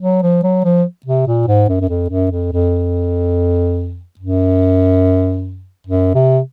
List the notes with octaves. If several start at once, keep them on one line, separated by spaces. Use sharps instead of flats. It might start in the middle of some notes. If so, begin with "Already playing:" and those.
F#3
F3
F#3
F3
C3
A#2
G#2
F#2
F#2
F2
F#2
F2
F2
F#2
F#2
C3